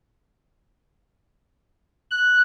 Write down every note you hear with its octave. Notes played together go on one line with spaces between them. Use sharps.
F#6